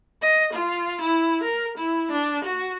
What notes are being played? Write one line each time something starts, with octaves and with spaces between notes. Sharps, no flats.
D#5
F4
E4
A#4
E4
D4
F#4